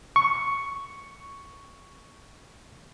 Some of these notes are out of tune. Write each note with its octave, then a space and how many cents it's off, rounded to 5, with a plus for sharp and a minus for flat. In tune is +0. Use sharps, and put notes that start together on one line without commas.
C#6 +5